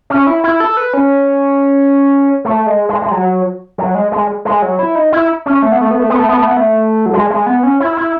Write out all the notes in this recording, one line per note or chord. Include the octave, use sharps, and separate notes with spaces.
C#4
E4
E4
A4
B4
C#4
A3
G#3
G#3
G#3
F#3
F#3
G#3
G#3
G#3
F#3
E4
D#4
E4
C#4
A3
B3
A3
B3
A3
B3
A3
B3
A3
B3
A3
F#3
G#3
G#3
B3
C#4
E4
E4